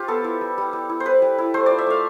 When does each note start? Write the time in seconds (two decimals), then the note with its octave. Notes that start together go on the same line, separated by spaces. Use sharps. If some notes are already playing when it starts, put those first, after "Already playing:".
Already playing: F4 G4
0.08 B3 A4
0.24 E4
0.41 G3
0.58 G3
0.73 G3
0.90 E4
1.00 C5
1.05 G3 B4
1.22 G3
1.38 E4
1.54 A3 C5
1.66 F4 D5
1.78 E5
1.87 A3 F5